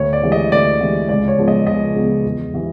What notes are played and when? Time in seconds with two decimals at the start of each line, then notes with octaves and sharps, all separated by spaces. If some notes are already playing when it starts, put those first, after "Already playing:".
Already playing: D2 C#5
0.13 D5
0.23 C3 E3 G#3
0.32 D#5
0.52 D2 D5
0.80 C3 E3 G#3
1.09 C#2 D5
1.28 C#5
1.38 C#3 F3 G#3 B3
1.48 D#5
1.67 C#2 D#5
1.96 C#3 F3 G#3 B3
2.25 E2
2.53 C3 E3